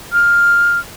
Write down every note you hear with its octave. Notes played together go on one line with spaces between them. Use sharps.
F6